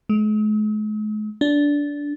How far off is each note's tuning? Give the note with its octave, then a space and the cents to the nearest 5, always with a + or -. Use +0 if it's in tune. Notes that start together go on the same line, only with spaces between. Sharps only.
G#3 +45
D4 -15